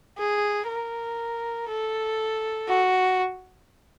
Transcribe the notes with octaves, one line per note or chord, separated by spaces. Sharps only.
G#4
A#4
A4
F#4